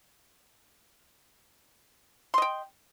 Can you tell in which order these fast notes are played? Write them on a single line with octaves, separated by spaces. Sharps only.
C6 D#5 G5